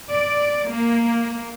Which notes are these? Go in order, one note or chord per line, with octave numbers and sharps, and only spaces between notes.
D5
A#3